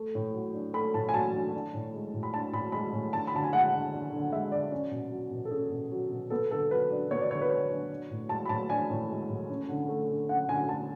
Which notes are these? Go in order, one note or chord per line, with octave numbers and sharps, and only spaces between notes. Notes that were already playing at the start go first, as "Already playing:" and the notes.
Already playing: A3
A2
F#3
D4
A3 B5
A2 A5
G#5
F#3 A5
D4
D4
A2
G#3
A2
B5
D4 A5
A2 B5
G#3 B5
A2
D4 A5
B5
D3 A5
G#5
G#3 F#5
D3
D4
D3
G#3 E5
D3 D5
C#4
B2
F#3
B2
A4
C#4 G#4
B2
F#3
B2
B3 A4
D3 A4
F#3 B4
D4
B3 C#5
D5
D3 C#5
B4
F#3 C#5
D4
D4
A2
G#3 A5
B5
A2 A5
D4 G#5
A2
G#3
A2
C#4
D3
A3
D3
C#4 F#5
D3 G#5
A3 A5